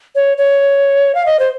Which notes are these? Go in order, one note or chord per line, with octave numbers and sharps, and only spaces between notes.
C#5
C#5
F5
D#5
C5